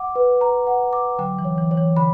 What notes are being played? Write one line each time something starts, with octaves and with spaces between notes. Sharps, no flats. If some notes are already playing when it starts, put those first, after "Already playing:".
Already playing: F#5 D6
B4
A#5
F#5
D6
D3 F#3 G5
E3
C#5
E3
C#5
E3
D3 B5